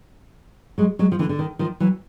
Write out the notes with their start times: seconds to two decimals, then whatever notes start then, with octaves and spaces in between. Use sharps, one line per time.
0.78 F#3 G#3
0.99 F#3 G#3
1.12 F3
1.19 D3 E3
1.29 D3
1.39 D#3
1.59 D#3 F3
1.80 E3 F#3